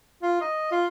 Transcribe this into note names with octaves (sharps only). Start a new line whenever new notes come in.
F4
D#5
F4